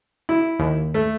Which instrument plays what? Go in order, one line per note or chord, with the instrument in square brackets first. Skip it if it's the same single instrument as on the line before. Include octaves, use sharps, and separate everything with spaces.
[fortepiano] E4
[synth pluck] D#2
[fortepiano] A3